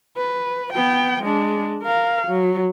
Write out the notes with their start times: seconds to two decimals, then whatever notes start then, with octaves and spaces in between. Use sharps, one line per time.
0.17 B4
0.73 B3 G5
1.23 G#3 D4
1.83 A#4 F5
2.27 F#3